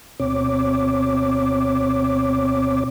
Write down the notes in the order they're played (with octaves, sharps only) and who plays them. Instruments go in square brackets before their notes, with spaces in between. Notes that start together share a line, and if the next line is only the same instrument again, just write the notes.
[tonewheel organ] D2 B2 C4 C#5 D6